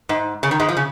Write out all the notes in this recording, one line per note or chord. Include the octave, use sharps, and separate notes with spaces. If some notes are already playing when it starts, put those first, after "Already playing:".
G#2
C#3
D#3
G#2 G#3
F3
C#3